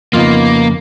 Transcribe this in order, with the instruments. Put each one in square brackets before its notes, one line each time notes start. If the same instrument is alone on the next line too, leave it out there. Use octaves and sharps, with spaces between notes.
[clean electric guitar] F2 C#3 [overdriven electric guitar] A#3 [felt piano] B3 D#4 F4